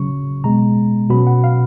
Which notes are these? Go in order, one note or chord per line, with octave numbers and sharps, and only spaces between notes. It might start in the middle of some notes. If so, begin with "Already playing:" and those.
Already playing: C#3 F#3 C#4 C#6
B2 G#3 B3 A#5
B2 F#3 C#4 B5
F#5
F5